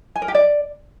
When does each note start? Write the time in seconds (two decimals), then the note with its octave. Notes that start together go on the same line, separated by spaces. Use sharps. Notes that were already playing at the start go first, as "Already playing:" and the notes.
0.16 G#5
0.22 A#4
0.28 G4
0.35 D5